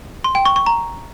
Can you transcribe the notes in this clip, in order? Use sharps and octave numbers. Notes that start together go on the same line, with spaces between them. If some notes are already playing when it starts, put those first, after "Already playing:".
C6
G5
C#6
C#6
A#5